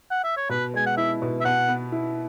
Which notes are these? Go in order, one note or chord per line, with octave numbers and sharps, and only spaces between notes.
F#5
E5
C#5
B2 B4
G#3 G#5
F#5
E4 E5
B2
E5
B2 F#5
B3
E4